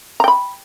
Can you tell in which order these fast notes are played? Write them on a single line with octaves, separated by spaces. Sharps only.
A#5 G5 B5